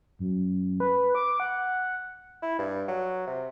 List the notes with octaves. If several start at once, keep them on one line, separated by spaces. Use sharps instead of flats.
F#2
B4
D6
F#5
E4
G2
F#3
C3